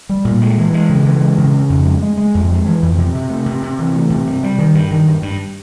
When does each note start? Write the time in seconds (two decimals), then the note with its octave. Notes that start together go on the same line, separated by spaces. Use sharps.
0.09 G3
0.25 A#2
0.42 G#3
0.58 E3
0.74 G#3
0.89 C#3
1.05 E3
1.21 G#3
1.38 C#3
1.53 C#3
1.70 F2
1.86 G#3
2.02 G#3
2.18 G#3
2.35 F2
2.51 G#3
2.66 E3
2.83 F2
2.98 C3
3.14 C3
3.30 A3
3.46 C3
3.63 C3
3.79 E3
3.95 A3
4.10 C3
4.27 G2
4.43 G3
4.58 D#3
4.75 G2
4.91 D#3
5.07 G2
5.22 G2